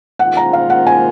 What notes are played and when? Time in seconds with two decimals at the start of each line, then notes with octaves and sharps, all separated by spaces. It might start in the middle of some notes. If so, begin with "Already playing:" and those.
0.19 G#2 D#3 A#3 F4 F#5
0.37 A#5
0.53 F5
0.70 F#5
0.87 G#5